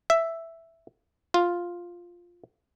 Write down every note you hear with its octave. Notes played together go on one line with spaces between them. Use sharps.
E5
F4